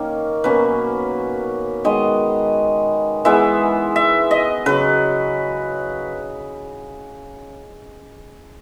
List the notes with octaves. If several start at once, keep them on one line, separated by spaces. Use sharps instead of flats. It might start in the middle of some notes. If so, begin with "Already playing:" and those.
Already playing: D#3 A#3 C#4
B2 F#3 A#3 C#4 B4
D#3 G#3 B3 D#5
E3 G#3 B3 E5
E5
D#5
C#3 F#3 B4